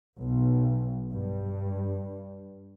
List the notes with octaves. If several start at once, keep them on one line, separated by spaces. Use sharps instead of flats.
B1
G2